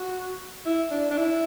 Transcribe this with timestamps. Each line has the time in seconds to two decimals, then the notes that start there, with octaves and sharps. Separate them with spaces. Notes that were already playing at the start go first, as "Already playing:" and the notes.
Already playing: F#4
0.66 E4
0.91 D4
1.10 D4
1.17 E4